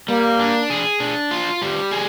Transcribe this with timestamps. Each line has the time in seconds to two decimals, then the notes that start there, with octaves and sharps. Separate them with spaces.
0.08 G3 A#3
0.39 D4
0.70 G#4
1.00 D4
1.31 F4
1.62 G3
1.91 G#4